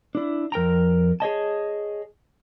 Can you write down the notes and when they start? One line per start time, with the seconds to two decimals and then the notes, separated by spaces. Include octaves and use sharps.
0.15 D4 E4
0.52 F2 A#4 G5 A#5
1.20 G#4 C#5 D#5 A5